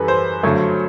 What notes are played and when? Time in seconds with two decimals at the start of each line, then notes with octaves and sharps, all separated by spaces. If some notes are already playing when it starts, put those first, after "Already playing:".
Already playing: F#2 E3 G3 A4 B4
0.08 C5
0.43 G2 D3 F#3 A3